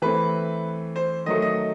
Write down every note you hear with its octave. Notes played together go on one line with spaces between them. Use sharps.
E3 A3 C4 B4
C5
D#3 F#3 A3 D#5
D#5